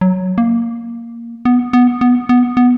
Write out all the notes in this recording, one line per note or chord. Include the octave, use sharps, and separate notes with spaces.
F#3
A#3
B3
B3
B3
B3
B3